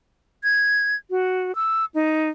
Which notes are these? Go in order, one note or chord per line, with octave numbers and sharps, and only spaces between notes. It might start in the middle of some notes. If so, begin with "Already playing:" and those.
G#6
F#4
E6
D#4